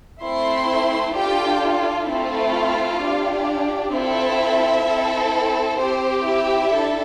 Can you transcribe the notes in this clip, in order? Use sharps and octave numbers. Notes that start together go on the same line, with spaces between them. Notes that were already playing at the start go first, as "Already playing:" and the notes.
A3 C4 E4 C5 C6
D4 F4 G4 A4 G5
A3 C4 E4 F4 A4 F5
D4 G4
C4 E4 F4 A4 E5
C4 E4 A4
C4 G4 C5
E4 E5
D4 A4